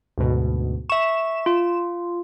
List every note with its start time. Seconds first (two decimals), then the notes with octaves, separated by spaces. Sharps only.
0.18 D2 G#2 B2
0.90 E5 C#6 E7
1.46 F4